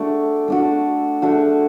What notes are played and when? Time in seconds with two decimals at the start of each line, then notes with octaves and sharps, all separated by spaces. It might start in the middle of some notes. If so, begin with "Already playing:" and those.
Already playing: A3 D4 F#4
0.48 A3 D4 F#4
1.22 A3 D4 F#4